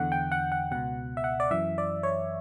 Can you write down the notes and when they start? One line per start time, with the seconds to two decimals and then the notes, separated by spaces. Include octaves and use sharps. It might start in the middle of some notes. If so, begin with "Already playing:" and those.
Already playing: E2 D3 F#5
0.12 G5
0.32 F#5
0.52 F#5
0.71 C#2 B2 F#5
1.17 E5
1.24 F#5
1.40 D5
1.51 F#2 E3 E5
1.78 D5
2.03 C#5